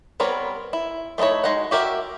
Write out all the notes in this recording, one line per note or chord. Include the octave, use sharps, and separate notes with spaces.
G3 B3 C4 A#4 C#5
E4
A3 C4 D#4 E4 C#5
G#3 D#4 F#4 F#5
F#4 G4 A#4 E5